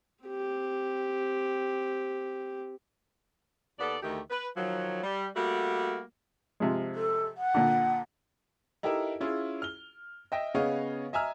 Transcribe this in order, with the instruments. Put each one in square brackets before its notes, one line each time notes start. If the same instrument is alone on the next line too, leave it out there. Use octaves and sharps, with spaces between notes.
[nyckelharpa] C4 G4
[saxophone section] D#2 B3 A4 D5
D2 D#3 A3 G4
B4
D#3 F3 F#3
G3
G3 A3 A#3 F#4
[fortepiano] C3 F3 G#3
[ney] A4
F#5
[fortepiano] A#2 D3
[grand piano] D#4 E4 G4 A4 A#4 E5
C#4 E4 F4 G#4
F6 G7
D#5 E5 G5 A#6
C#3 B3 C#5 D#5 F5
D#5 E5 G#5 A#5 E6 F6